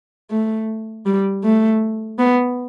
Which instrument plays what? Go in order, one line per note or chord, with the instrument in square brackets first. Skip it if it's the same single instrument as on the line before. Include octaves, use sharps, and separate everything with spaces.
[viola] A3
G3
A3
B3